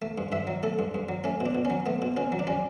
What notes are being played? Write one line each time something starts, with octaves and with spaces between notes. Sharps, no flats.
A3
G2
G2 E5
F#3
A3 A4
G2
G2
F#3
A3 C#4
B2
D4
B2
C#4
F#3
A3 B3
B2
B2 C#4
F#3
D4
G3 C#4